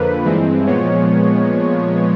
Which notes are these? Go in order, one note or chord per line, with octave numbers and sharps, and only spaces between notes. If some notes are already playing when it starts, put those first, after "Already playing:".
Already playing: F2 D3 F3 A#3 B4
G2 E3 G#3 C4
A#2 F3 G#3 B3 C#5